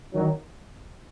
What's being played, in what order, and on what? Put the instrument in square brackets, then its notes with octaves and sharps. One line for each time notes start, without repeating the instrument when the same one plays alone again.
[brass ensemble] D#3 F#3